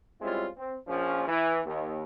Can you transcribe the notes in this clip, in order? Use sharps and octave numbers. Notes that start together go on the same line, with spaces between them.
G3 G#3 C4 C#4 E4 F4
C4
A#1 F3 C#4
E3
D#2